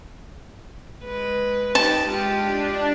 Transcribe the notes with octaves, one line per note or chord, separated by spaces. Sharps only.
G#3 B4
D#4 G4 B4 A5
G#3 F4 G4
D4